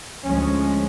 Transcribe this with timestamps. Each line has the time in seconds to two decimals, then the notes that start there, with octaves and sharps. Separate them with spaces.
0.24 D2 F3 G#3 C#4